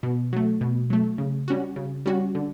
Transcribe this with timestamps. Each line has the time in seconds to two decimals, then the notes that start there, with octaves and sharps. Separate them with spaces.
0.03 B2
0.33 F#3 A3
0.61 B2
0.90 F#3 A3
1.18 C#3
1.48 G3 C#4 F#4
1.76 C#3
2.06 G3 C#4 F#4
2.35 D3